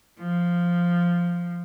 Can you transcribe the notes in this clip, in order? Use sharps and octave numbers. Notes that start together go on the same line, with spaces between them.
F3